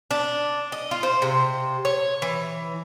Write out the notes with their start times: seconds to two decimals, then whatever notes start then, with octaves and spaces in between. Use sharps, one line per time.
0.11 D4
0.72 D#5
0.91 F4
1.03 C5
1.22 C3
1.85 C#5
2.22 E3